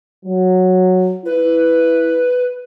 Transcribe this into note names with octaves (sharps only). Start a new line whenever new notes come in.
F#3
E4 B4